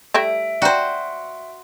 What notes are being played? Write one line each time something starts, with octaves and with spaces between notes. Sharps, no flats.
G3 A3 E4 E5 A#6 D7
F#4 C5 D5 G5 A#5